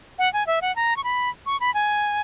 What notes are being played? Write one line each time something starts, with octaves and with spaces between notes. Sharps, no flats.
F#5
G#5
E5
F#5
A#5
C#6
B5
C#6
B5
G#5